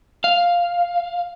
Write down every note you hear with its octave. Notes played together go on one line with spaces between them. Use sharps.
F5